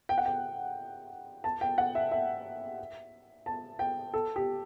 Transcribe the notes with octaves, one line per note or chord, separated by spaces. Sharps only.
G5
F#5
G5
A5
G5
F#5
E5
E5
A5
G5
A4
G4